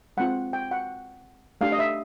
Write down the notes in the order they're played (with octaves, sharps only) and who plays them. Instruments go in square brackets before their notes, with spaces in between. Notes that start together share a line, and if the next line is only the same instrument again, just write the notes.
[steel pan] G#3 C4 F4 F#5
G5
F#5
A3 D4 G4 F5
D#5
E5